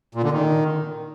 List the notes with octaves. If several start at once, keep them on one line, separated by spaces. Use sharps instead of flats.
A#2
D3
D#3